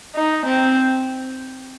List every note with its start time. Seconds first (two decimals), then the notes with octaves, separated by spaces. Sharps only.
0.15 D#4
0.45 C4